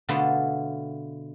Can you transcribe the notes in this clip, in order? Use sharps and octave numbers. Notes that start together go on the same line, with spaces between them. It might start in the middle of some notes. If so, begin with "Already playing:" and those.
B2 D3 A3 B3 F4 A4